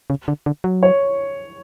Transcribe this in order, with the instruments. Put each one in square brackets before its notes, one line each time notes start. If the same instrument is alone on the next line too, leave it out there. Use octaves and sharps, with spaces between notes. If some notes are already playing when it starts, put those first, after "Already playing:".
[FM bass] C#3
D3
D3
F#3
[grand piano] C#5